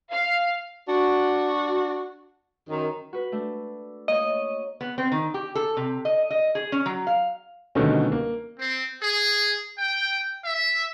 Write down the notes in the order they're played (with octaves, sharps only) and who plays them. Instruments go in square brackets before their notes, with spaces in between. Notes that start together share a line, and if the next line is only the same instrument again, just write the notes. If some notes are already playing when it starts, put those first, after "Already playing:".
[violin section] F5
[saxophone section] D4 F#4
F#2 D#3
[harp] F#4 B4
A3 D4
[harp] A#3 C#5 [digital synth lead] D#5
[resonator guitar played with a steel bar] B3
C4
D#3
G4
A4
C3
D#5
D#5
G#4
C#4
F#3
F5
[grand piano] B2 D3 D#3 G3 A3 C#4
A#3
[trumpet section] C4
G#4
G5
E5